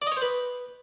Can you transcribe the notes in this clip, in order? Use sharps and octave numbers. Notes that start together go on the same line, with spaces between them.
D5
D#5
C#5
C5
B4